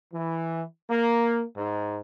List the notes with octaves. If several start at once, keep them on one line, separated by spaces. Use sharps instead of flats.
E3
A#3
G#2